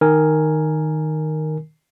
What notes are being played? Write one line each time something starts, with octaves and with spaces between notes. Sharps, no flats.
D#3 A#4 G#5